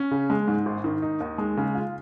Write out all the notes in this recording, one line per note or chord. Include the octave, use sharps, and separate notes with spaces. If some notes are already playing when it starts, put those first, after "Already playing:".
Already playing: C#4
C#3
G#3
G#2
G#1
D#3
D#4
D#2
G#3
C#3
F4